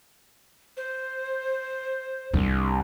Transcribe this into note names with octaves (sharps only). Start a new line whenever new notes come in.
C5
C2 D4